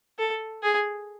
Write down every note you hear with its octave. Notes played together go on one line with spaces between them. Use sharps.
A4
G#4